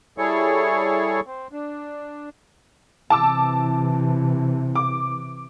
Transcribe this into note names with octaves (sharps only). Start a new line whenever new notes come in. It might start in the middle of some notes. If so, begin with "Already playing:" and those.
G3 E4 G#4 A4 C#5 C#6
C4
D4
C3 E3 A5 D6 E6
D6